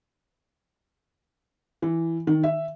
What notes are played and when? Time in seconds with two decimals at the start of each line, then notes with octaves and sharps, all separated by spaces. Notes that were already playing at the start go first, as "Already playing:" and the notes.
1.82 E3
2.27 D#3
2.43 E5